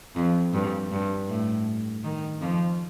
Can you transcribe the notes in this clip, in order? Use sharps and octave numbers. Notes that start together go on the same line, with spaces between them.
F2
G2
G2
A2
D#3
F2 F3